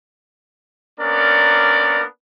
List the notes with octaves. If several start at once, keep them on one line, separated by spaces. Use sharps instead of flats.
A#3 B3 C#4 D4 A#4 D5